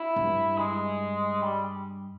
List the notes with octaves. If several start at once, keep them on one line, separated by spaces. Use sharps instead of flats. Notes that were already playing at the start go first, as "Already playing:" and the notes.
Already playing: E4
G2
G#3
G3